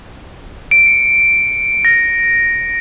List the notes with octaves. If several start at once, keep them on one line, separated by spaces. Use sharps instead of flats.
D7
C#7
A#6